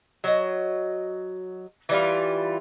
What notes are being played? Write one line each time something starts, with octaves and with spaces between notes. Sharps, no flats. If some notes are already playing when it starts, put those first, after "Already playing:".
F#3 D#5
E3 G3 F4